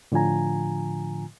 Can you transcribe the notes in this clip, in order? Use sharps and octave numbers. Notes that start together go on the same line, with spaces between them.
A2 D3 F3 F4 G#5 A#5